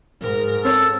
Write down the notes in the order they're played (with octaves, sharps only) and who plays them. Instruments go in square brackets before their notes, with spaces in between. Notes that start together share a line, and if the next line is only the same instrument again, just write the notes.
[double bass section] G#2 [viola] A#4
[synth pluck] C4 C#5 [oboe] A4